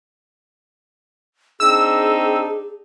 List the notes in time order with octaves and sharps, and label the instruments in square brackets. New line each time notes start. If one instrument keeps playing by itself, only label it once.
[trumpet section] C4 D4 D#4 [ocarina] G#4 [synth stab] E6